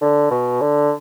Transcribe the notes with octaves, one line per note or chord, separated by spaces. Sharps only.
D3
B2
D3